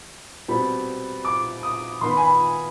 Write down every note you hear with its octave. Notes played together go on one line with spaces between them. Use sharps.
B2 G3 C4 B5
D6
D#6
D#3 B3 C6
B5
G#5
B5